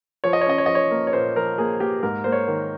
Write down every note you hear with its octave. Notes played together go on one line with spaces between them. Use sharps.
F3 C#5
D#5
C#5
C#4 D#5
C#5
F3 D#5
C#5
A#3
C#5
A#2 C5
F3 A#4
A#3 G#4
A#3 G4
G#2 A#4
A#3 C5
C#5
D#3